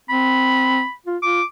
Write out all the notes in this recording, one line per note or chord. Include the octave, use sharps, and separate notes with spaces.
C4 B5
F4
F4 D6